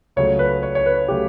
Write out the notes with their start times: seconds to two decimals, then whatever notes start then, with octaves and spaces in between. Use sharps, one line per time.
0.16 C#2 C#3 F#3 A3 C#5
0.39 B4
0.63 C#5
0.75 C#5
0.86 B4
1.08 C#3 F#3 A3 G4